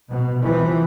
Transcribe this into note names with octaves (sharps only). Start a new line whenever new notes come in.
B2
C3 E3 F3